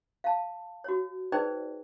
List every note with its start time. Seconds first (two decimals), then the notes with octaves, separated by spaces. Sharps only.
0.24 F5 A5
0.84 F#4 C#5
1.32 D#4 G#4 B4 C5 D5 G5